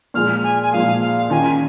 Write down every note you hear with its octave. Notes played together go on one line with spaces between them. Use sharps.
A#2 F3 G#3 F6
G#5
G#5
A#2 F3 G#3 F5
F5
D#3 C#4 F4 G#5